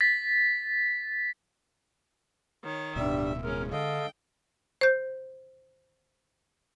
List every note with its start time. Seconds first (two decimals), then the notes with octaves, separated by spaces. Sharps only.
0.01 A6 B6
2.64 D#3 C#5
2.96 D1 G2 B2 G3 E5
3.43 G#3 C#4 A#4
3.72 D3 A4 D#5 F5 G5
4.81 C5 G6